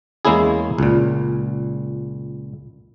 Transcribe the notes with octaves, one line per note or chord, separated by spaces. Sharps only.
E2 G#3 A#3 C#4 E4 G#4
C#2 A#2